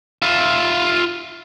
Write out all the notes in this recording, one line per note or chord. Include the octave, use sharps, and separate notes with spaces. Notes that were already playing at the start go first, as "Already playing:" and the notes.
F4 E5